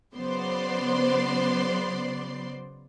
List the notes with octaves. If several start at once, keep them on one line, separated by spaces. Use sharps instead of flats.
C#3 F#3 B3 C5 D5 C6